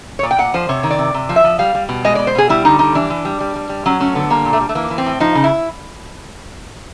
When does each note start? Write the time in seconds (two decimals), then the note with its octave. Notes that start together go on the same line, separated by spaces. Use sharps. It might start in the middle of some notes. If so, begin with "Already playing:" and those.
0.19 C#5
0.23 A#2 D5
0.31 G5
0.38 A#2 F#5
0.54 F3 C5
0.69 C3 C#5
0.83 D#3
0.91 D5
0.98 C3
1.14 C3
1.29 F3
1.36 E5
1.44 F3
1.59 G3 F5
1.75 G3
1.89 B2
2.05 G#3 D#5
2.15 B2 D5
2.27 C5
2.35 B2 G#4
2.49 G3 E4
2.65 D3 D#4
2.79 G3 D#4
2.95 E3 D4
3.10 E3
3.25 G3
3.41 G3
3.56 G3
3.69 G3
3.86 F#3 C#4
4.00 A3 C#4
4.15 D3 B3
4.30 G3 A#3
4.45 A#2
4.53 A3
4.60 G3
4.69 A3
4.75 E3 A#3
4.90 E3
4.98 C4
5.06 A2
5.20 F3 D#4
5.35 C#3
5.44 E4